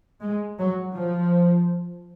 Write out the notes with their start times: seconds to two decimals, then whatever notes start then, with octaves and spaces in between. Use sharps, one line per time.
0.22 G#3
0.59 F#3
0.95 F3